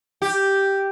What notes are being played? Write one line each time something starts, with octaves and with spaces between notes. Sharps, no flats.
G4